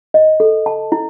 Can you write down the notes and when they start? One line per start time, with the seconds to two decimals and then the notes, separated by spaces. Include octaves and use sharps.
0.14 D#5
0.40 A4
0.66 A5
0.92 E4